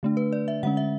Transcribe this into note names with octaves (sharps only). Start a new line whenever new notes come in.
D3 A3 D4
B4
D5
E5
D3 G#3 C#4 F#5
E5